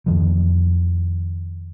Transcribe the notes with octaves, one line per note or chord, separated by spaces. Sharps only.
F2 D#3 F3